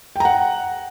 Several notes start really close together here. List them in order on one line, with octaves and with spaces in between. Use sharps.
G5 A#5 F#5